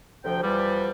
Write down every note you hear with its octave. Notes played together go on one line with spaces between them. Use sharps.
D2 C3 F3 G5
E2 F3 G3